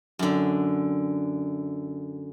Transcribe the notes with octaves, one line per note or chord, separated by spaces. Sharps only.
F#2 D3